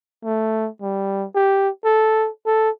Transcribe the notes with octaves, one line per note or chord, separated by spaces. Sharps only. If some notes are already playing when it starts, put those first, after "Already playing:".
A3
G3
G4
A4
A4